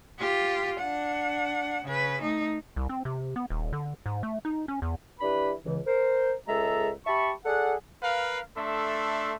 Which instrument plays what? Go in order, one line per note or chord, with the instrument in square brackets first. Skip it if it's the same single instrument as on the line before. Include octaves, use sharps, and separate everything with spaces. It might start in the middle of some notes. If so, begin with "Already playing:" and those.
[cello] F4 G4
D4 F#5
C#3 B4
A3 D#4
[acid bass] C2
C4
C3
B3
D#1
D3
G#2
A3
D#4
C#4
E2
[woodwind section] E3 D4 G4 B4 B5
C#2 C#3 E3
A#4 C5
C#2 G#3 G#4 A4 E5 A#5
G4 E5 A5 B5 C#6
G#4 A4 D5 F#5
[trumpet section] A#4 B4 F5
A3 D4 A4 E5 C6